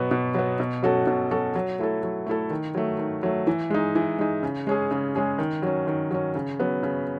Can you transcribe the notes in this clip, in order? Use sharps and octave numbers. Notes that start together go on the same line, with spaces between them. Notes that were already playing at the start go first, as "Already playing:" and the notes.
Already playing: B2 F#3 B3
B2
F#3 B3
B2
F#3 C#4 F#4 A4
B2
F#3 C#4 F#4 A4
F#3
A3 E4 A4
F#3
A3 E4 A4
D#3
F#3 A3
D#3
F#3 A3
E3
G#3 D#4
E3
G#3 D#4
C#3
G#3 C#4 G#4
C#3
G#3 C#4 G#4
D#3
F#3 C#4
D#3
F#3 C#4
C#3
F#3 B3
C#3